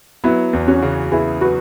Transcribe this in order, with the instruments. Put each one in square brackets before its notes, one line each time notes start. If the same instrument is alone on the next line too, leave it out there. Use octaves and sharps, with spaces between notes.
[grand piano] F#3 [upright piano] B3 E4
[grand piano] E2
[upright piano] C#4 F#4
[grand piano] C#3
[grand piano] B3 [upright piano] E4 G#4
[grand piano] F#3 [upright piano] F#4 B4